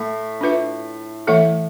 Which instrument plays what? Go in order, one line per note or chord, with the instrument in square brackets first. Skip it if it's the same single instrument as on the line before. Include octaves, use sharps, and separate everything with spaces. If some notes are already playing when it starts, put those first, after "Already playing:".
Already playing: [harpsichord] A2
[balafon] D4 F4 B4 E5
E3 A3 E4 A4 E5